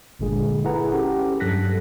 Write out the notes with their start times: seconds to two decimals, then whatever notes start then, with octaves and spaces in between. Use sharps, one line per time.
0.20 G1 A#2 D3 G#3 G#4
0.64 E4 G#4 A4 B4 F#5 A#5
0.93 C#4 G4 A4
1.40 G2 F#3 A4 F#6 A#6 B6